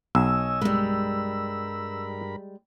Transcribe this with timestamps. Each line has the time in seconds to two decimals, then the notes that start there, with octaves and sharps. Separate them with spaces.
0.15 B1 C#5 D#5 G#5 E6
0.61 G2 G3 G#3 A#4 B5